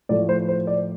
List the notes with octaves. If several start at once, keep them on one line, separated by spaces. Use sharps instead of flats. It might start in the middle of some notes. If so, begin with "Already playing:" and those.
A2 F3 A3 D5
C5
C5
D5